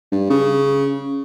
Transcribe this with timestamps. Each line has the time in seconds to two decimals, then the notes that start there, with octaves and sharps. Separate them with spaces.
0.12 G2
0.30 C#3